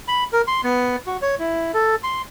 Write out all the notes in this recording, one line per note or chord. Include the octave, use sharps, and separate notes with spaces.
B5
A#4
C6
B3
F#4
C#5
E4
A4
C6